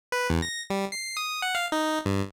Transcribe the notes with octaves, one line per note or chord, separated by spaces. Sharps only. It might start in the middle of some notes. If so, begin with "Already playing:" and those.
B4
E2
A#6
G3
C7
D#6
F#5
F5
D#4
G2